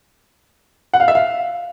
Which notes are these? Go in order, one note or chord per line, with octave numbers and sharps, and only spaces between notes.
F#5
F5
E5
F5